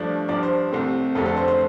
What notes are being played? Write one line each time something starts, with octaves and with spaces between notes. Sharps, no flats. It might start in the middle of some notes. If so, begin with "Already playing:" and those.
Already playing: G2 F3 A3 D4
G2 F3 D4 D5
C5
C2 C3 A3 C4
F1 F2 D3 A3 C4 A4
A4
C5
C5